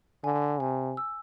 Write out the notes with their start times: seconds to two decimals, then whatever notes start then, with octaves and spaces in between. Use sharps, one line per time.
0.24 D3 G#5
0.60 C3 G#5
0.97 E6